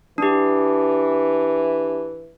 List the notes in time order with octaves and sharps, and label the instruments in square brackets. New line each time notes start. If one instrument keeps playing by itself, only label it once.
[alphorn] E3 [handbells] D4 G4